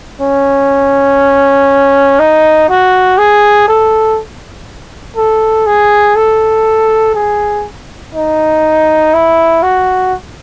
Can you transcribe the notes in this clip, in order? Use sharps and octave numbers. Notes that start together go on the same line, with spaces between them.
C#4
D#4
F#4
G#4
A4
A4
G#4
A4
G#4
D#4
E4
F#4